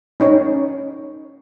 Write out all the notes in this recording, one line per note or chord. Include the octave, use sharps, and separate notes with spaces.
C#4 D#4 C#5